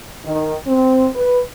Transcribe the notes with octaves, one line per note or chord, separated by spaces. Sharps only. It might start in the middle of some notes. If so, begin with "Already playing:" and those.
D#3
C4
B4